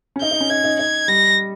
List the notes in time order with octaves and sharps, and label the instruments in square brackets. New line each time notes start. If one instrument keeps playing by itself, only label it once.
[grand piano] C#4
[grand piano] D#4 [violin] G6
[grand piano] D#4
C#4
[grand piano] D#4 [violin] G#6
[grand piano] D#4
[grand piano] D#4 [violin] G#6
[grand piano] G3 [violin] A#6